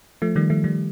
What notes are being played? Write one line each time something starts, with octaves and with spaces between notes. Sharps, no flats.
F3 A3
D#3 G3
F3 A3
D#3 G3